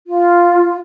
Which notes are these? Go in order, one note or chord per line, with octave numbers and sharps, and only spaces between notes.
F4